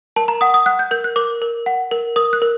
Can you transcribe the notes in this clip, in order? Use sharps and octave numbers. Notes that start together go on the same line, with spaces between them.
A#4 A5
A#5
F#5 D#6
D#6
F#5 F#6
G6
A#4 G6
F#6
A#4 D6
A#4
F#5
A#4
A#4 D#6
F#6
A#4